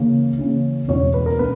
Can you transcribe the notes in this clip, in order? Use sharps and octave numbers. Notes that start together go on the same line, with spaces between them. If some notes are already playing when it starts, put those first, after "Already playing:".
Already playing: C#3 E3 A#3 C#4
C#3 E3 A#3 C#4
E2 B2 G#3 C#4 C#5
B4
A#4
B2 B4